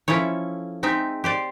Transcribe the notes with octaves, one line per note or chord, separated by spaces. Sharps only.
F3 C#4 E4 A4 C#5
G#3 C4 D#4 E5
G4 C5 D5